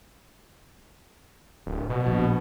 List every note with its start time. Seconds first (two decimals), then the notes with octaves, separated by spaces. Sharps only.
1.66 D1
1.90 B2
2.07 A#1